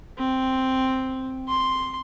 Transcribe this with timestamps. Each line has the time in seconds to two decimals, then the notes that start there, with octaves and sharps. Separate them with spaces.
0.19 C4
1.49 C6